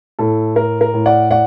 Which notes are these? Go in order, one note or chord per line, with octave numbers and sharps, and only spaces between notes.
A2 A4
A2 A#4
A#4
A2
D5 F#5
A2 D5 F#5